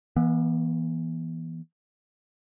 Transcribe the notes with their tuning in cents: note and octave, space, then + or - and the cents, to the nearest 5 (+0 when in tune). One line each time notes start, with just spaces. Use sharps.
E3 +0 B3 -40